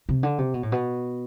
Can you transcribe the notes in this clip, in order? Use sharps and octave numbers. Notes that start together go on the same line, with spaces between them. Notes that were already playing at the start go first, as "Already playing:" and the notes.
C3
D3
C3
B2
A2
B2